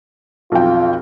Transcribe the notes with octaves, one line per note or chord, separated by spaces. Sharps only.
B1 F2 F4 G5